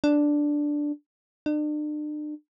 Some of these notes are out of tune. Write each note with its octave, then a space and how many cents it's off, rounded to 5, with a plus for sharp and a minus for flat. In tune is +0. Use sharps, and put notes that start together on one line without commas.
D4 +0
D4 +40